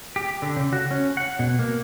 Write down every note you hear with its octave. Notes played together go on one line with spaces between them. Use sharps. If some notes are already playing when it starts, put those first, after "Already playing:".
G4
D3
C#3
F#4
C#4
F#5
B2
A#3